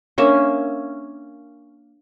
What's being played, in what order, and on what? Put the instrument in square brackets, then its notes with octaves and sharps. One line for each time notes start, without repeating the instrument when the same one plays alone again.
[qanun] A#3 C#4 E5 [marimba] D4 A#4 C#5